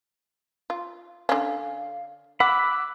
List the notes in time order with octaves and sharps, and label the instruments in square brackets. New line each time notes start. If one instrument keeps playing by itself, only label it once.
[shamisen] F4
[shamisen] D3 C#4 [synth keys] F5
[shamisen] F#5 [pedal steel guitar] B5 [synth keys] D6 E6 F#6